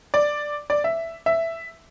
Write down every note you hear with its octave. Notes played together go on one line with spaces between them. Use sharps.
D5
D5
E5
E5